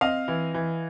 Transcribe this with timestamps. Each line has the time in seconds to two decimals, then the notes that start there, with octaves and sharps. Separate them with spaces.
0.01 C4 D#5 F5
0.28 E3
0.54 E3